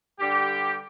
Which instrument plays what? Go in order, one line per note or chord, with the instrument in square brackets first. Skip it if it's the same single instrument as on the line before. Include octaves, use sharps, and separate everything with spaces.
[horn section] G2 D3 G3 G4